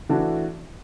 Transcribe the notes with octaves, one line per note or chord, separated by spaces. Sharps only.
E3 A3 D4 F#4